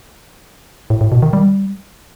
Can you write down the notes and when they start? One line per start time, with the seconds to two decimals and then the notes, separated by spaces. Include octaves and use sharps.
0.90 A2
1.01 A2
1.12 B2
1.22 D#3
1.33 G3